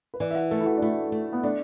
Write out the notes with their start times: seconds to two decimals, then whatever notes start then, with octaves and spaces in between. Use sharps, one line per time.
0.14 B4
0.20 E3 D5
0.31 E5
0.35 F#5
0.51 A3 A4
0.60 E4
0.66 F#4
0.77 D4
0.82 A3 E4
1.12 A3
1.33 B3
1.43 A3 D4